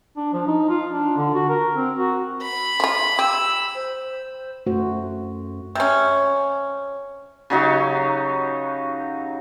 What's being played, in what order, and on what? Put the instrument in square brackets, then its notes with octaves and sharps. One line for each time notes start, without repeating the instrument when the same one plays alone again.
[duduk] D4
F3
D#4
F4
D4
D3
F#4
A#4
C4
F#4
[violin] B5
[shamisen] F3 F4
[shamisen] G4 [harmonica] E6
[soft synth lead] C5
[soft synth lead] F#2 [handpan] A3 F#4 C5
[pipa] C3 C#4
[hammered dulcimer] C#3 F#3 D#4 G4